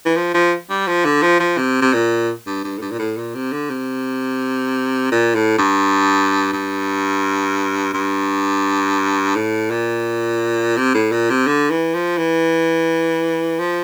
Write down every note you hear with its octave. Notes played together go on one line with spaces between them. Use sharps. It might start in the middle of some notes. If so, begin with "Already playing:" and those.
E3
F3
F3
G3
F3
D3
F3
F3
C3
C3
A#2
G2
G2
A2
G2
A#2
A2
A#2
C3
D3
C3
A#2
A2
G2
G2
G2
A2
A#2
C3
A2
A#2
C3
D3
E3
F3
E3
F3